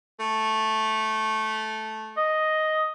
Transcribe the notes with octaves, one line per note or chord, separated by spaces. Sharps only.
A3
D#5